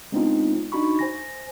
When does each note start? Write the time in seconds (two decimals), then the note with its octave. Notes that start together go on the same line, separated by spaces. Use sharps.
0.12 G#3 B3 C4 D4 D#4 F4
0.72 D4 D#4 F#4 B5 C#6
0.99 C5 G#5 A#6